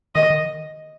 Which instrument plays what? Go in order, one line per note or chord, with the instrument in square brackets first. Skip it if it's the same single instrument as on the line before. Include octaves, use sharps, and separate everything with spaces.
[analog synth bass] D#3 [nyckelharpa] D#5
[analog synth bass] D#3